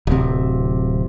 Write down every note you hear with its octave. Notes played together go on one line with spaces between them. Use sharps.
D1 C3